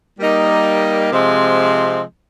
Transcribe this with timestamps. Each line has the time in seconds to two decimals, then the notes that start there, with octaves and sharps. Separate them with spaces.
0.19 G3 A#3 D#4
1.10 C3 F3 G#3 C4